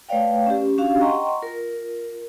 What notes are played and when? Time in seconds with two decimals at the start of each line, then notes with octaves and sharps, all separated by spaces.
0.09 A3 B4 C#5 D5 F5 G5
0.47 C#4 G4
0.78 C#4 D4 F#4 G4 F5
1.01 D#5 F#5 G5 A#5 C6 C#6
1.42 F4 A#4